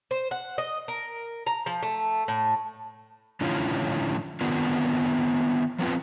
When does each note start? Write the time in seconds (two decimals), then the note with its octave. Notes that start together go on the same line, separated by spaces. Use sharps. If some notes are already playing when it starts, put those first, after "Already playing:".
0.11 C5
0.31 F#5
0.58 D#5
0.88 A#4
1.47 A#5
1.66 F3
1.83 A3
2.28 A2
3.41 A2 D3 F3 C#4 E4 F4
4.41 D#3 B3 C4 D4 F4
5.79 F3 B3 C4 F4